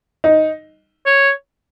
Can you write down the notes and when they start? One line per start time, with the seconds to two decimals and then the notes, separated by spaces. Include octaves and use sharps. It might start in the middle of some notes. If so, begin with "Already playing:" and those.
0.24 D#4
1.06 C#5